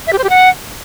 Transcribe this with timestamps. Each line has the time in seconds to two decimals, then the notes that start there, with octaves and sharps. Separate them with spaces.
0.07 E5
0.13 G4
0.18 C5
0.24 G4
0.30 F#5